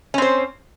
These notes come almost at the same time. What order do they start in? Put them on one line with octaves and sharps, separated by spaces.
C#4 C4 C5